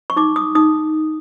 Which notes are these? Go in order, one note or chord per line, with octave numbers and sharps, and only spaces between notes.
C#6
D#4 D6
D#6
D#4 D#6